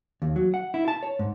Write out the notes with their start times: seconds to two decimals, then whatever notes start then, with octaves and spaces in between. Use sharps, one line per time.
0.22 D#2
0.36 F#3
0.54 F#5
0.74 E4
0.88 A5
1.03 C#5
1.19 G#2